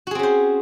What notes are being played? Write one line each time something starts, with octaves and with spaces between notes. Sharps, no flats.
C4 C#4 F#4 G#4 C5